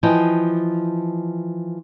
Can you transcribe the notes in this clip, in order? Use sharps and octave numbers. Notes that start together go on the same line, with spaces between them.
E3 F3 D#5 G5